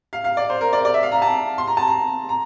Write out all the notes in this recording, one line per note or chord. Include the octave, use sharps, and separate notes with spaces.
F5
F5
D5
C5
A#4
D5
D5
E5
F5
A#5
A5
C6
A#5
A5
A#5
A#5